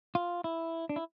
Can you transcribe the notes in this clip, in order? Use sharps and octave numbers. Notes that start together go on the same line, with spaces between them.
F4
E4
D4
E4